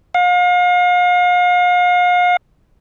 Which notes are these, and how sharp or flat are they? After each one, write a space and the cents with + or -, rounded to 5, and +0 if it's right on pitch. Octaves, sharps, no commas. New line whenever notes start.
F5 +40